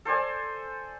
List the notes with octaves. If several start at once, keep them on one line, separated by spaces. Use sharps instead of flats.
A4 C5 D5 G#5